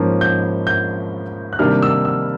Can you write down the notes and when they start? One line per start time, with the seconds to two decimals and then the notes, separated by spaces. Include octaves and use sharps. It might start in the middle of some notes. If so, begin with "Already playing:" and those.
Already playing: G#2 F3 A#3 C#4
0.21 G6
0.67 G6
1.53 F#6
1.59 C3 D#3 G3 A#3 D4 F6
1.82 E6
2.05 E6